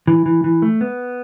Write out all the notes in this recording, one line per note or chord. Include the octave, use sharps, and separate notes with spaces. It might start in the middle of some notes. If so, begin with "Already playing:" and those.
E3
E3
E3
A3
B3